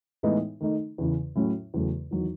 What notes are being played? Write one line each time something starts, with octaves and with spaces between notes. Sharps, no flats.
A2 E3 G#3 B3 D#4
D#3 A3 D#4
E2 C#3 E3
A2 F#3 C#4 E4
E2 C#3 F#3 A3
E2 D#3 F#3